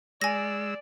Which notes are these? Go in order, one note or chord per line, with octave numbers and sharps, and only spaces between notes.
G#3 D5 G#5 E6 A#6